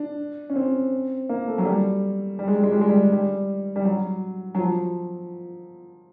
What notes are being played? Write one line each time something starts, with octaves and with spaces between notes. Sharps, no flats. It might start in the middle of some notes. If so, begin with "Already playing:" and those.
Already playing: D4
C#4
C4
A#3
A3
F#3
G3
G3
G#3
G3
G#3
G3
G#3
G3
G3
G3
F#3
F#3
F3